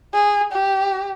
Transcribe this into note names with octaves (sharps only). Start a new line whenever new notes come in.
G#4
G4